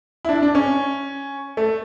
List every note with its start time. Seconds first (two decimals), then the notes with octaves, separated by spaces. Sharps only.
0.25 E4
0.29 D4
0.43 D4
0.55 C#4
1.57 A3